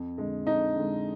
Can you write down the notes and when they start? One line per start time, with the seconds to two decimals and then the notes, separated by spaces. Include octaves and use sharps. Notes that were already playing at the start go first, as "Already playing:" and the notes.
Already playing: F2
0.18 D3 G#3
0.46 F2 D#4 D#5
0.75 D3 G#3